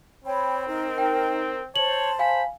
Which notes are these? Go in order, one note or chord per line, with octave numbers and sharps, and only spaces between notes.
C4 C#5 G5 B5
D#4 A#4
G5
C5 C#5 A5 F#7
F5 G#5 B5